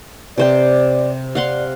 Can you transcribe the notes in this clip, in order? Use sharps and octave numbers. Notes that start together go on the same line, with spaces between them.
C3 C5 D5 G5
D5 F5 F#5 C6